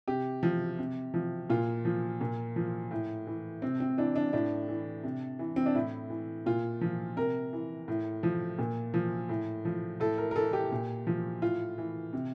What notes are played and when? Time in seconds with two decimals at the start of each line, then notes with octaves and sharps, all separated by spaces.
0.08 C3 G4
0.43 F3
0.78 C3
1.14 F3
1.50 A#2 F4
1.85 F3
2.21 A#2
2.56 F3
2.91 A2
3.27 E3
3.62 C3 C4
3.80 C4
3.98 E3 D4
4.16 D4
4.33 A2 D4
4.69 E3
5.03 C3
5.39 E3
5.56 C4
5.66 D4
5.75 A2 E4
6.10 E3
6.46 A#2 F4
6.81 F3
7.17 C3 A#4
7.53 E3
7.88 A2
8.23 F3
8.59 A#2
8.94 F3
9.29 A2
9.65 F3
10.00 A2 A4
10.18 A#4
10.31 A#4
10.36 E3 A4
10.53 G4
10.72 A#2
11.07 F3
11.42 A2 F4
11.78 E3
12.13 C3